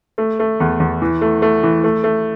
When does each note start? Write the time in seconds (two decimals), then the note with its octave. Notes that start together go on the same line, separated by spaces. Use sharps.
0.18 A3
0.39 A3
0.60 E2
0.80 E2
1.02 E3
1.21 A3
1.42 A3
1.63 E3
1.84 A3
2.04 A3